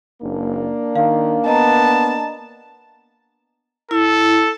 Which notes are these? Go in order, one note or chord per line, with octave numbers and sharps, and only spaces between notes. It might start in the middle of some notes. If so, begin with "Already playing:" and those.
F#1 A#3 D4
D#3 F5
B3 D#5 A5 A#5
E4 A4